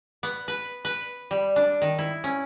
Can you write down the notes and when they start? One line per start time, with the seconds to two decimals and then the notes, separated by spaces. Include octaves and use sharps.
0.23 B3
0.48 B4
0.85 B4
1.31 G3
1.56 D4
1.82 D#3
1.98 E4
2.24 C#4